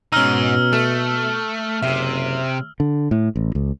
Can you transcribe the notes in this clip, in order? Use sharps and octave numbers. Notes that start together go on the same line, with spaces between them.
G#2 B2 C#4 D#4 A#5 E6 F6
A3 A4
F#1 C3 E5
D3
A2
A1
C#2